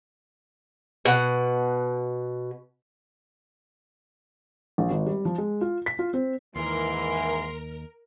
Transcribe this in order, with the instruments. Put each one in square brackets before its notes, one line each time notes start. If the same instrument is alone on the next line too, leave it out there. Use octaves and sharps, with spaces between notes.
[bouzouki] B2 F#5
[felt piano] A#1
G#1
G3
F3
G#3
F4
B6
F4
C4
[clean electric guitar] D#2 [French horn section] G#2 E3 [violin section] A#4 [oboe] C6